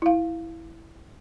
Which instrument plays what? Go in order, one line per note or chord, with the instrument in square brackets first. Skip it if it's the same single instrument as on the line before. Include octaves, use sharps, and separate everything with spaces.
[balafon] E4 F5